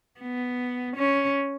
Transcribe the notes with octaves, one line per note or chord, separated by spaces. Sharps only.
B3
C#4